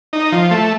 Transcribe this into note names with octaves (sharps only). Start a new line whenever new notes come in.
D#4
F3
A3